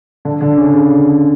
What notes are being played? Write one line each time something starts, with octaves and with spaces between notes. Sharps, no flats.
D3 D4
D3 D4
C#3 C#4
C#3 C#4